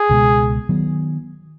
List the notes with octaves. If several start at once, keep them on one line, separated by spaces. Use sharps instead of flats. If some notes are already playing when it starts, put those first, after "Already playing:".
Already playing: G#4
C#2 B2 G#3
D#3 F#3 B3